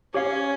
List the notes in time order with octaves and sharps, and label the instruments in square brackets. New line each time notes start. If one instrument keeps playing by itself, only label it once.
[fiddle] C#4 [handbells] G4 C#5 F5